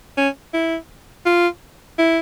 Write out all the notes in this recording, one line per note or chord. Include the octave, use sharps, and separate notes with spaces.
C#4
E4
F4
E4